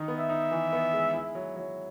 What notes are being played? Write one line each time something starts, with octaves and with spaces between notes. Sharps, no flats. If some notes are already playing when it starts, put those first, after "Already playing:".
Already playing: D#3 D#4
B3
E5
D#4
E3
B3
G#3
E4
F#3
F#3